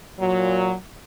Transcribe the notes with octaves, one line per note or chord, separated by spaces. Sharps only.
A#2 F#3